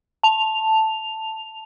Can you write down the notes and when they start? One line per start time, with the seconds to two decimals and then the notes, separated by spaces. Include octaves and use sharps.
0.23 A5 F7